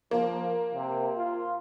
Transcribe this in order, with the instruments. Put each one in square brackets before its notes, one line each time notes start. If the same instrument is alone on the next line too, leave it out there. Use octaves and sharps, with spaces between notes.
[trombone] F3 [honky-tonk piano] A#3
[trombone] C3
F4